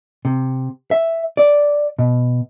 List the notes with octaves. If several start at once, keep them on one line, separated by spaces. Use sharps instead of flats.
C3
E5
D5
B2